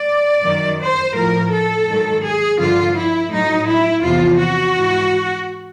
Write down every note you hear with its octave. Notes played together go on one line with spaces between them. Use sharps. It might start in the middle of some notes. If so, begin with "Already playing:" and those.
Already playing: D5
F#2 D#3 F#3
C5
A2 F3 A#4
A4
G#2 D#3 F#3
G#4
G2 D3 F3 F4
E4
A2 F#3 D#4
E4
E2 C3 F3 F4
F#4
G#2 E3